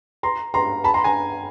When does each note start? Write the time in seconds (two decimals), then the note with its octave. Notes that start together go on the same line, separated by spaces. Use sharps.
0.23 A#5 C6
0.54 A#5 C6
0.84 A5 B5
0.94 A#5 C6
1.04 G#5 A#5